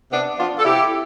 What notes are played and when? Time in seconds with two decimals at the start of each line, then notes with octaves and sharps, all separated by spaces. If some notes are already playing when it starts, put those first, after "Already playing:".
0.11 C3 B3 D4
0.37 F3 B3 D4 F4
0.59 A4
0.64 C3 E4 G4